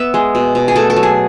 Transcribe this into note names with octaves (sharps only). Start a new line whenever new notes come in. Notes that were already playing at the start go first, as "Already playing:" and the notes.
Already playing: B3 E5
G#3
B2
B2
G#4
A3 A4
A4
F#3
G#4